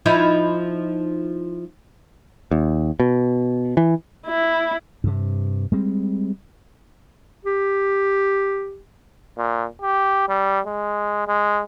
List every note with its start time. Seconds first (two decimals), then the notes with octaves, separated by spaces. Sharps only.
0.06 F3 D#4 E4
2.51 D#2
3.00 B2
3.77 E3
4.27 E4
5.04 G2 C3
5.72 G3 G#3 C4
7.45 G4
9.37 A#2
9.82 G4
10.28 G3
10.66 G#3
11.28 G#3